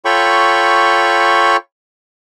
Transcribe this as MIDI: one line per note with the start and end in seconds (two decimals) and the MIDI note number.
0.05 1.57 65
0.05 1.57 69
0.05 1.57 73
0.05 1.57 79
0.05 1.57 83
0.05 1.57 85